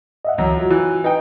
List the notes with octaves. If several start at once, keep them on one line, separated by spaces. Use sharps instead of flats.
D#5 E5 F#5
C#2 F#2 E3 F#3 A#5
F4 F#4
E3
D#4 B4 G5